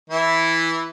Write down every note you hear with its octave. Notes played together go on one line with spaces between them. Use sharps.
E3 E4